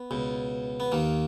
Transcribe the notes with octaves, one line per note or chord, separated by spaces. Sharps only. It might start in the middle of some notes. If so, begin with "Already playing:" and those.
Already playing: B3
C#2 B2
B3
D#2 D#3 A#3